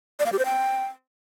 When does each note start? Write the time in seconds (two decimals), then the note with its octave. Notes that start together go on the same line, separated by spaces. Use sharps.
0.19 D5
0.26 F5
0.32 G4
0.39 C5
0.45 G5